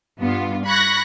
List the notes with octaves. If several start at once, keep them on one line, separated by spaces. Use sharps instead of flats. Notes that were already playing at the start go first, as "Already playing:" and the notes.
G2 B3 F4
B5 C#6 F#6 G#6 A#6 C#7